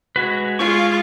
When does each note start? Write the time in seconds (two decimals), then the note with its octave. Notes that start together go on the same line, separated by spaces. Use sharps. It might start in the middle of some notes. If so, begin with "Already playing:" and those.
0.16 G#3 F#4 B4
0.59 G#3 F4 C#6